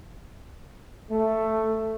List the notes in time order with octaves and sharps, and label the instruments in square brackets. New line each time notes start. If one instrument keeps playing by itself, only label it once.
[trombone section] A3